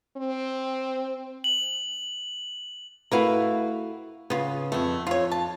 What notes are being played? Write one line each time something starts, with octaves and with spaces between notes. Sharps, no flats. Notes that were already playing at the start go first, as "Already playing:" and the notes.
C4
F#7
A3 E4 F#4 A#4 B4 F5
C#3 B3 F4
F2 A3 B3
F2 F4 C#5
A5